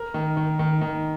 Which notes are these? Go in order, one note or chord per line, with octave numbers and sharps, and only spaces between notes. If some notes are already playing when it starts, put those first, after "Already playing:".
Already playing: A#4
D#3
D#3
D#3
D#3